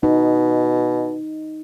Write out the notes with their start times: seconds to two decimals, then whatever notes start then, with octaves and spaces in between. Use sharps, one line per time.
0.03 B2 D#4